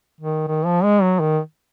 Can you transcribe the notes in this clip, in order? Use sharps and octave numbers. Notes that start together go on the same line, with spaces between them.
D#3
D#3
F3
G#3
F#3
D#3